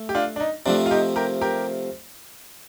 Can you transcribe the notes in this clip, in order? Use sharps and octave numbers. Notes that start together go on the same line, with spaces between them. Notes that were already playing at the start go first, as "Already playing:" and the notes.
Already playing: A3
G4
D4 F4
D4
D#4
C3 F3 A3 D4
F4
D#4 G4
G4 A#4
G4 A#4